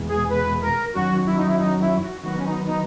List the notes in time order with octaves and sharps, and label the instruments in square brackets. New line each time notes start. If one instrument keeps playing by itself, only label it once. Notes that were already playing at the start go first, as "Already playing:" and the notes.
Already playing: [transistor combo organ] E2 B2 G#3
[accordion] G#4
B4
A#4
[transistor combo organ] F#2 D#3 F#3 C#4 [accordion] F#4
[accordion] E4
D#4
E4
D#4
E4
F#4
[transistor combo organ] D#3 F#3 B3 [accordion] F#4
[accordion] C#4
D#4
D#4